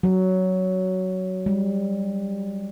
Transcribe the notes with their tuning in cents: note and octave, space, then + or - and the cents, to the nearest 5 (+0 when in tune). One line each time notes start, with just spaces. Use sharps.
F#3 +10
G3 +25